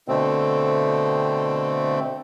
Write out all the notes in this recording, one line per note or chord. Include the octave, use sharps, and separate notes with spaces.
B2 D3 A3 C4